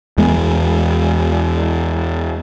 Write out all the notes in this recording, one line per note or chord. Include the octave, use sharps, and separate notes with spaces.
E2 E3 G#3 B3